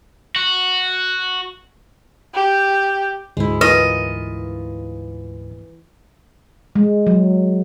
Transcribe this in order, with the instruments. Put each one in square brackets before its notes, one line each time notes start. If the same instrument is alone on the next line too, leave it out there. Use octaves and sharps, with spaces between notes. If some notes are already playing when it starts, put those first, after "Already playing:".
[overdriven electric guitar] F#4
[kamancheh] G4
[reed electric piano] D2 G#2 [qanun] G#3 E4
[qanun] E3 F4 A#4 [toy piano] B4 [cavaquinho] D#5
[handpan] G#3
F#3